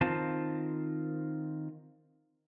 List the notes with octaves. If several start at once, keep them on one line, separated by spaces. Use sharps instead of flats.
D#3 C4 F4 C5 A5